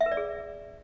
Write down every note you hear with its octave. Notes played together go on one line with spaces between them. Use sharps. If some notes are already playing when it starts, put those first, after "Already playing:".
E5
B4
D5
G#4